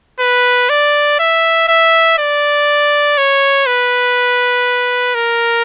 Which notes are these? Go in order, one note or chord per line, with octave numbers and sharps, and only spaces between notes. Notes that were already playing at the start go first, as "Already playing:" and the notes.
B4
D5
E5
E5
D5
C#5
B4
A#4